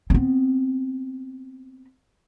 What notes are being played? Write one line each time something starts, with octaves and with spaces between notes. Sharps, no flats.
B3 C4